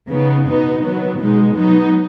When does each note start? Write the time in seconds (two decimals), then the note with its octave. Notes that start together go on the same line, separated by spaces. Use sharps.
0.09 C#3 B3 D#4
0.45 B2 B3 D#4
0.83 D#3 F#3 B3
1.19 B2 G#3 D#4
1.56 F#3 B3 D#4